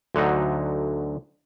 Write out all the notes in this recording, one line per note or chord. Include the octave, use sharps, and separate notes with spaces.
D2 D3 F#3 D#4